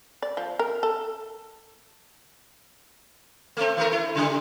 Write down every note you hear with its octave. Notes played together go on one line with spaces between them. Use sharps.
D5
F3
A#4
A4
A3 C4
E3 A3 A#4
E4
C#3 G3